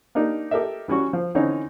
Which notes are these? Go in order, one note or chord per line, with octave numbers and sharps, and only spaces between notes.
A#3 D4 D#4 G4
G4 A4 A#4 D#5 E5
E3 G3 C#4 F#4 C#6
F3
D3 E3 C4 C#4 D#4 C#5